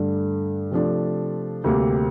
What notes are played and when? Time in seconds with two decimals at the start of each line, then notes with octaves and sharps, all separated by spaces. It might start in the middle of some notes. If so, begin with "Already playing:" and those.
Already playing: G2 D3 A3 D4
0.71 C3 F3 A3 D4
1.64 D2 C3 G3 A#3